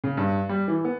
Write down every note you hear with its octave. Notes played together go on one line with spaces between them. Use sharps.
C#3
G2
G3
E3
B3